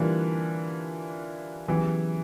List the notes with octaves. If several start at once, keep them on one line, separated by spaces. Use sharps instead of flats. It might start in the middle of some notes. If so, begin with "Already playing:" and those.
Already playing: D3 E3 G3 A#3 D4 F4
C#3 E3 F#3 B3 E4 G4